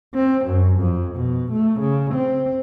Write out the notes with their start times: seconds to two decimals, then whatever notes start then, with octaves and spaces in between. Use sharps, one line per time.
0.15 C4
0.45 F#2
0.80 F2
1.15 B2
1.51 A3
1.80 C#3
2.14 C4